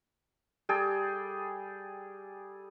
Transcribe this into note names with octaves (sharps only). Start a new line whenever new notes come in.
G3 G#4 A4 G5